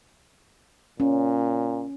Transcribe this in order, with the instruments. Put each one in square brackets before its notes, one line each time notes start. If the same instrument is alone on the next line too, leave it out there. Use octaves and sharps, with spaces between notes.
[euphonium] A#2 [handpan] C#4